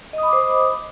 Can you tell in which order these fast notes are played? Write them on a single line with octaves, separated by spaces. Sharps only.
D#5 D#6 B5 D6 C5